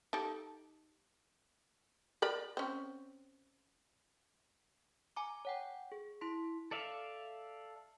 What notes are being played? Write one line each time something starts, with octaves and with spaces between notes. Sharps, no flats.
D#4 G4 A4
A#4 D5 B5
C4 C#4
G#5 A#5 D6
C#5 F#5 G5
G#4
E4 C6 B6
A4 D5 E5 F5